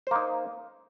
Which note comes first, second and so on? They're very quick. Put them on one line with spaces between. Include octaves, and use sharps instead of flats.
C5 A#3 D#4